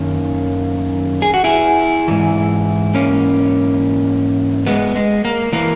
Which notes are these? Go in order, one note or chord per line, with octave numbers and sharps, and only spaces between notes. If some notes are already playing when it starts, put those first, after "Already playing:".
Already playing: F#2 D#3 A#3 C#4
G#4
F#4
E4 G#4
G#2 E3
A#3 C#4
G#3 B3
G#3
A#3
E3 A#3